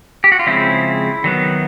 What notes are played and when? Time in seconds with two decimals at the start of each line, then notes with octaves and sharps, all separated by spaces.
0.24 G4
0.32 F#4
0.39 F4
0.46 C#3 F3 G#3 C4 E4
1.24 D#3 F#3 B3